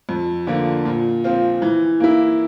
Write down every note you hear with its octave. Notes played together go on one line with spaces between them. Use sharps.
F2
D3 F3 A#3
A#2
F3 C4 F4
E3
A#3 E4